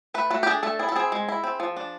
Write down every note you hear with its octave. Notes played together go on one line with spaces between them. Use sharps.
A3 B4
A3 F#4
G4
D4 G#4
A3 A4
E4 G#4
A4
C4 G#4
G#3
E4
C4
F3
D4